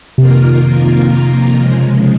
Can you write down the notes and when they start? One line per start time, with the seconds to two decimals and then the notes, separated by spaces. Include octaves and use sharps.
0.18 F2 C3 D#3 A#3 F4 A#4
1.61 C#3 F3 G#3